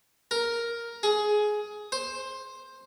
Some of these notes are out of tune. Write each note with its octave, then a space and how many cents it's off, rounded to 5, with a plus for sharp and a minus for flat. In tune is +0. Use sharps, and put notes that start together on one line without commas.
A#4 +5
G#4 +15
C5 +10